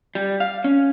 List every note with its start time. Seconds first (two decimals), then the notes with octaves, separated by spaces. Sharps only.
0.15 G3
0.40 F5
0.64 C#4